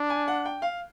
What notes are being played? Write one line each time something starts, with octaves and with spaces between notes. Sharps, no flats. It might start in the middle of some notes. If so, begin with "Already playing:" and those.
Already playing: D4
G#5
F#5
G5
F5